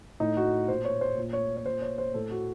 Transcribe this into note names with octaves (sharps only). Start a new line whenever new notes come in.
A2 D#4
F#4
A#2 C5
C#5
C5
A#2
C#5
C#5
A#2 C5
C#5
C5
A2 A4
F#4